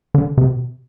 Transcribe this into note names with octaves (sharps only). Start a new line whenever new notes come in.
D3
C3
B2